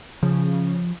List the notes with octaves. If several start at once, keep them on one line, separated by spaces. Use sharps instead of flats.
C#3 F3